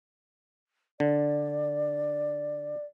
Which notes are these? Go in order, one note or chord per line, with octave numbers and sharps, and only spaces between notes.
D3 D5